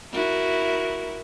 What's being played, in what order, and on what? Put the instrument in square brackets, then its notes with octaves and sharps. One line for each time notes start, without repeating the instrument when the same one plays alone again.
[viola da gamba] E4 F#4 A#4